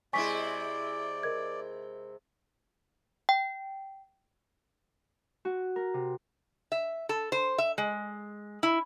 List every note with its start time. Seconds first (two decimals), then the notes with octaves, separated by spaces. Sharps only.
0.13 C3 G#3 E4 D5 G#5 C#6 B6
1.23 A#4 D#5 G#6
3.29 G5
5.45 F#4
5.76 A#4
5.94 C3
6.72 E5
7.09 A4
7.32 C5
7.58 E5
7.78 G#3
8.63 E4